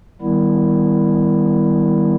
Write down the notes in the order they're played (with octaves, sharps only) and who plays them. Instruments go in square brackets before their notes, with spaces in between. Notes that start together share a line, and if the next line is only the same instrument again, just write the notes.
[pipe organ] D#3 G3 B3 E4